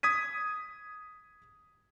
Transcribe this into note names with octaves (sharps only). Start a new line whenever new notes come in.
D#6 G#6 B6 D#7